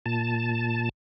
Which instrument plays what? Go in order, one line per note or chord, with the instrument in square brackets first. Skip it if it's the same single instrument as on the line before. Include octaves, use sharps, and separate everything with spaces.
[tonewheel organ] A#2 A5